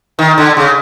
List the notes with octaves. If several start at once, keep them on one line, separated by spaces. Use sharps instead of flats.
D#3
D3
C#3